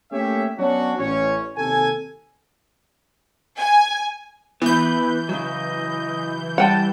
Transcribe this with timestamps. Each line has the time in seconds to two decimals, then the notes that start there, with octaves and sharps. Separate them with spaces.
0.13 A3 A#3 C#4 G4 C#5 E5
0.59 F#3 B3 C#4 D4 F#4
0.98 A1 C#4 C#5
1.57 D#2 C3 A4 G#5
3.58 G#5
4.62 E3 B3 B4 G6
5.29 C#3 F#3 D#5
6.58 G3 F#5 G5 A5